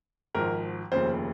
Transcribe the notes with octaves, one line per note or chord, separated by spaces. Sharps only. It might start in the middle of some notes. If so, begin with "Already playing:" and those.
G#1 G#2 F3 A#4
F1 D#2 C#3 F3 C5